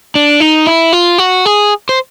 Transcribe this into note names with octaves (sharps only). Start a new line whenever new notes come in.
D4
D#4
E4
F4
F#4
G#4
C5